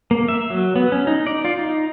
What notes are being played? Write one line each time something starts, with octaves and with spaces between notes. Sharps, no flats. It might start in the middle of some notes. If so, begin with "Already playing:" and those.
A#3
E5
F#3
B3
C#4
D#4
D5
F4
D#4